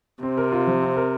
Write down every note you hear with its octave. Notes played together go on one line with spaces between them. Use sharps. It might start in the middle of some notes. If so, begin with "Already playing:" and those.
C3 C4
A#4
F4
F3
C4
A#4